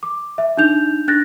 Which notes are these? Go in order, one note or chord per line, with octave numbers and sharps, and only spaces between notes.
D6
E5
D4 D#4 G6 F7
D4 F#6 A6 A#6